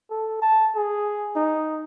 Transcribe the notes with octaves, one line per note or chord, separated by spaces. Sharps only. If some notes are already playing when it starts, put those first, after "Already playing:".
A4
A5
G#4
D#4